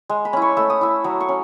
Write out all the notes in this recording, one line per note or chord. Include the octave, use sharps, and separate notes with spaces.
G#3
B5
C#4 E4
C#6
A3 E6
D#6
E4 E6
F#3 D#6
C#6
C#4